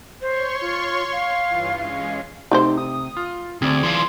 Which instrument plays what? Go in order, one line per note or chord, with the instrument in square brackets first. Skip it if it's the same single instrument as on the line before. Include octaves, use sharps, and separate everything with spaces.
[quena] C5 [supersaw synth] C#5 C6 C#6
[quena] F4
F5
[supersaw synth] G2 E3 F4
[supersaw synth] G#3 C#4 [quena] F5
[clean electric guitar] C3 [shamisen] A3 G4 C5 [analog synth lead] D#4
[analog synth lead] D#6
[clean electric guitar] F4
[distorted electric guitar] D2 [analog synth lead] C4 [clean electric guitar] G#4 D5
[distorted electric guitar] E3 F4 [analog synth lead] C6